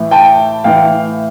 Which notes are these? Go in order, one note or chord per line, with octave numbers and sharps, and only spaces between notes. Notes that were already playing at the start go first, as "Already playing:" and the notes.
Already playing: A2 E3
G5 A5
A2 E3 F5 G5